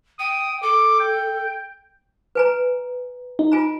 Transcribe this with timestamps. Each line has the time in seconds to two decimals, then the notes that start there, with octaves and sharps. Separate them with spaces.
0.19 G5 D#6
0.63 A4 D6
1.00 G5
2.35 B4 G#5 A#5
3.39 D#4
3.52 F4 G#5 A#5